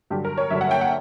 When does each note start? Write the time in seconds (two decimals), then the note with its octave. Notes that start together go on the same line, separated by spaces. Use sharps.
0.10 G2 D3 F#3 G4
0.25 A#4
0.38 C#5
0.50 G2 D3 F#3 E5
0.61 F#5
0.71 G5
0.81 F#5